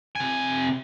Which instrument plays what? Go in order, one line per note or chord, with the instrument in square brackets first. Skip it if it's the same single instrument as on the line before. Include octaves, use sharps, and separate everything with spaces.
[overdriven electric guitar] C3 G#5